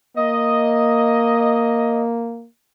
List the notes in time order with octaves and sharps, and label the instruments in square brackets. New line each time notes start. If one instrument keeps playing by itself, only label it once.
[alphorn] A#3 [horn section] D#5